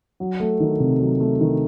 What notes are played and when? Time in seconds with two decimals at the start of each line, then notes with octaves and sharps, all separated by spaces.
0.20 F#3
0.40 A3
0.60 D#3
0.80 C3
1.00 F#3
1.20 A3
1.40 D#3